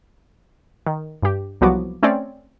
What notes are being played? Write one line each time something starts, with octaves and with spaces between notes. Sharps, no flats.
D#3
G2 G4
C2 F3 F#3 B3 F#4 D6
A3 C4 C#4 C#5 D5